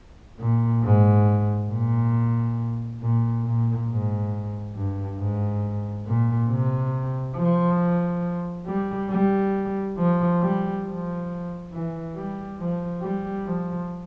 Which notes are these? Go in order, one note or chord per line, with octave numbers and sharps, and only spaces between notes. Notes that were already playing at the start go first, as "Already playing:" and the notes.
A#2
G#2
A#2
A#2
A#2
G#2
G2
G#2
A#2
C3
F3
G3
G3
F3
G3
F3
E3
G3
F3
G3
F3